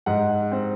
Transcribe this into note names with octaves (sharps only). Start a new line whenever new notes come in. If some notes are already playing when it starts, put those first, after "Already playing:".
G#2 F#5
C4